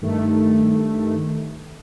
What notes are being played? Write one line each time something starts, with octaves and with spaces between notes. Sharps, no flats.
G2 D#3 A3